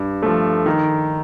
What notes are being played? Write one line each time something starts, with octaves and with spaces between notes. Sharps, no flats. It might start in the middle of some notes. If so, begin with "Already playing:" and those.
Already playing: G2
F3 A3
D#3